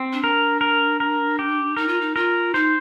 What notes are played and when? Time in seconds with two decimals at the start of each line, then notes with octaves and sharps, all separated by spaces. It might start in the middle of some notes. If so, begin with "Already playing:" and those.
Already playing: C4
0.13 D4
0.24 A#4
0.61 A#4
1.00 A#4
1.39 G4
1.77 D#4 A#4
1.88 F4
2.01 D#4
2.16 F4 A#4
2.54 D#4 C5